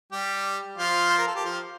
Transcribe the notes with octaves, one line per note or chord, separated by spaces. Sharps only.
G3 G4
F3 F4
C5
A#4
A4
G4
F3 F4